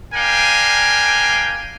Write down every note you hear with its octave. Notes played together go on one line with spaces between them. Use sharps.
D4 A#4 F5 G5 G#5